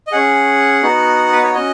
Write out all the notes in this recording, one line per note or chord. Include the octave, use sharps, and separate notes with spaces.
D#5
C#4 G#4 F#5
B3 D#4 F#4
B4
C#5
C#4 F#4 D#5